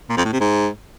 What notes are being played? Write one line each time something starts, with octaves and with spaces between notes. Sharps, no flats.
A#2
F2
A2
C3
G#2